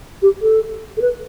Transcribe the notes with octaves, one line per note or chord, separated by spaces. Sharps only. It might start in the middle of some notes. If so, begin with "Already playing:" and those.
G4
A4
A4
B4